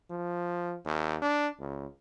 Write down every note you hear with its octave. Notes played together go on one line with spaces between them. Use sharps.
F3
D#2
D4
C#2